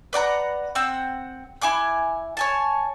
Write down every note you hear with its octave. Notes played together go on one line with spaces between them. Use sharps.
B4 D5 F#5 A#5
C4 F#5 E6
E4 G#5 D6 F#6
C#5 G#5 A5